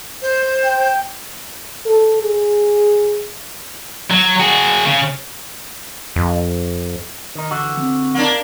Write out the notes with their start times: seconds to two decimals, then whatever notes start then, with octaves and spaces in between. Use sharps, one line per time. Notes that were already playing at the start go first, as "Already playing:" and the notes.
0.22 C5
0.64 G5
1.86 A4
2.22 G#4
4.11 F#3
4.40 F#4 G#4
4.86 C#3
6.16 F2
7.35 D#3 D#4
7.51 D3 E3 F#4
7.79 C4
8.14 A#3 D4